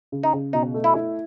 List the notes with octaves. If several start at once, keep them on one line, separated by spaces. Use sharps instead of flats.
C#3
D#4
C#3
B2 D#4
A3
E4
E4